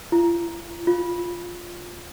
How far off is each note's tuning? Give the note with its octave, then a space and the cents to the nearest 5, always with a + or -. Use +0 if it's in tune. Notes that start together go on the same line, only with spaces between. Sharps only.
F4 -40
F4 +0